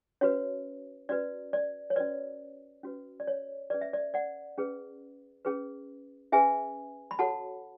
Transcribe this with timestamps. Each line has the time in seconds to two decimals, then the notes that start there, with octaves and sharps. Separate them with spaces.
0.21 C#4 F#4 B4 C#5
1.09 C#4 F#4 B4 D5
1.53 D5
1.90 C#5
1.96 C#4 F#4 B4 D5
2.83 C#4 F#4 B4
3.20 D5
3.27 C#5
3.70 C#4 G#4 B4 D5
3.81 E5
3.93 D5
4.14 D5 F#5
4.58 C#4 G#4 B4
5.45 C#4 G#4 B4
6.32 C#4 G#4 B4 E5 G#5
7.11 B5
7.19 F#4 A4 C#5 F#5 A5